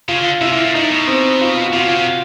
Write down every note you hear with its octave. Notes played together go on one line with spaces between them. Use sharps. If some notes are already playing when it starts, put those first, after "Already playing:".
C#3 F4
D3
C3 E4
A#2
A2
A2 D#4
B2
C4
F4
F#4
C3 F4
C#3
C3